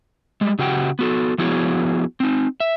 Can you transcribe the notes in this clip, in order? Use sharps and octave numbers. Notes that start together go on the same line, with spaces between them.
G3 G#3
C#3 F#4 G4 F#5 G5
B3 F#4 A4
F3 B3 E4 F#4 G#4 C#5
C4 D#4
E5